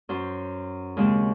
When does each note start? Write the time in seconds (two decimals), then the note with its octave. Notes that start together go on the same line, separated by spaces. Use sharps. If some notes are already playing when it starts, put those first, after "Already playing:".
0.09 F#2 C5
0.97 D#2 C#3 G#3 C4